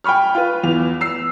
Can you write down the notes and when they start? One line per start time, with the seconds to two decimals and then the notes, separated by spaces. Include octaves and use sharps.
0.04 G5 G#5 B5 C#6 F6
0.35 F4 B4
0.63 E2 F7
1.01 E6 C7